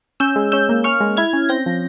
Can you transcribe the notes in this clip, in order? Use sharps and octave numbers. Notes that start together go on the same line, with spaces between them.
C#4 E6 G6
G#3
C#4 E6 G6
A#3
C#4 C#6 F6
G#3
E4 F6 G#6
C#4
C4 G6 A#6
F3